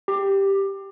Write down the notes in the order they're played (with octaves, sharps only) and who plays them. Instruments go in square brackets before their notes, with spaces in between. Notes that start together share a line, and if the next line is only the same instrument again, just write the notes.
[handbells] G4